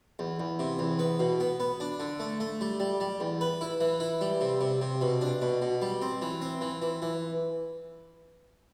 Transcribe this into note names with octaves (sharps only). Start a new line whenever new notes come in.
E2
E2
C3
E2
B3
B2
B3
B3
D4
D3
A3
A3
G3
G3
G3
E2
B4
E4
E3
E4
G3
C3
C3
C3
B2
D4
B2
B2
G3
C4
E3
C4
E3
E3
E3